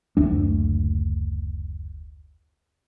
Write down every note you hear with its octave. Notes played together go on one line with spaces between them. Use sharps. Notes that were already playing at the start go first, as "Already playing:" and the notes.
F#1 D2 A3 D4